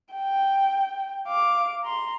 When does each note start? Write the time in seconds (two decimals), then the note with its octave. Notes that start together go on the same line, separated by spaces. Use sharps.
0.13 G5
1.28 F5 D6
1.83 A#5 C6